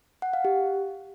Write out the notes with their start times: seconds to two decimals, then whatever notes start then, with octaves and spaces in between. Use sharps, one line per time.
0.22 F#5
0.33 F5
0.45 G4